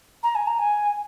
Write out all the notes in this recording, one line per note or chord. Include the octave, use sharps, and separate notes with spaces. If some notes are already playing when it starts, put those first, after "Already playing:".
A#5
G#5
A#5
G#5